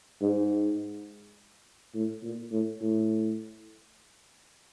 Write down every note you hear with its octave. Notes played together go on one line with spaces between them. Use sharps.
G#2
A2
A#2
A2
A2